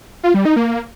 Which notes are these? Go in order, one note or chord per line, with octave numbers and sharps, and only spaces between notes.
F4
G3
D#4
A#3